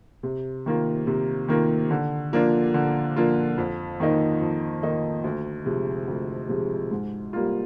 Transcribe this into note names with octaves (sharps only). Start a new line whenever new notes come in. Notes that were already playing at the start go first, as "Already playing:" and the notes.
C3
D#3 A#3 F4
C3
D#3 A#3 F4
D3
F3 A#3 D4 F4
D3
F3 A#3 D4 F4
F2
D#3 A#3 D#4
F2
D#3 A#3 D#4
D2
C3 F3 G#3
D2
C3 F3 G#3
G#2
G3 A#3 F4